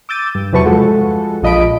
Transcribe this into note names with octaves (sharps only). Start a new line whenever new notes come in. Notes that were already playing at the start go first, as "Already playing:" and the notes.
D6 E6 G6 A6 D#7
G2
E2 C3 F#3 B4 A5 C#6
F3 G#3 F#4 A4
A#1 F3 D#5 B5 D7